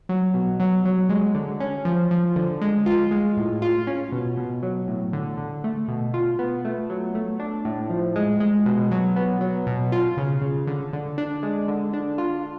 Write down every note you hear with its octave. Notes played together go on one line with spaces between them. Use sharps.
F#3
B2
F#3
F#3
G#3
D3
C#4
F3
F3
D3
G#3
F4
G#3
A2
F4
C#4
B2
B2
F#3
A2
D3
D3
A3
B2
F4
B3
A3
F#3
A3
D4
A2
F3
G#3
G#3
B2
F#3
B3
F#3
B2
F4
C#3
C#3
D3
D3
D4
G#3
D3
D4
F4